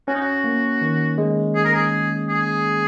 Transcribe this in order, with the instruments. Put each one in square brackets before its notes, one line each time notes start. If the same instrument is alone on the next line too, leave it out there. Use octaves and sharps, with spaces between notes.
[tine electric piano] C#4 [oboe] F#4
[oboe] D#4
F#4
[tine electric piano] A#3
D#3
G#3
[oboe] G#4
A#4
G#4
G#4